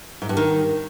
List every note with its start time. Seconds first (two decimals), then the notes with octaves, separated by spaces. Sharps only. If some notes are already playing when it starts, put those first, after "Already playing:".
0.22 G#2
0.29 G2
0.37 D#3